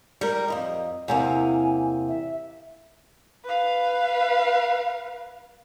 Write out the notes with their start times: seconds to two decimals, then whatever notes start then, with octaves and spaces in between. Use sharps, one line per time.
0.21 G3 A#4
0.48 F2 B2 D#5
1.08 E2 C3 A#3 G#5
2.08 E5
3.45 B4 F5